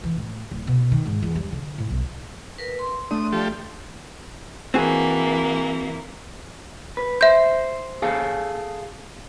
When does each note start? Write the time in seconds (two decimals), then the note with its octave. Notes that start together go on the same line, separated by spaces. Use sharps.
0.03 E3
0.17 A2
0.51 D1
0.67 B2
0.92 D#3
1.05 G#2
1.22 E2
1.35 G3
1.52 D3
1.78 A2
1.90 B1
2.58 A#4 B4
2.79 C6
3.11 A3 D4 D#6
3.33 F3 G4 A4
4.74 E3 A#3 C4 F#4 G#4
6.97 B4
7.21 C5 E5 G6
8.02 G#4 A4 F5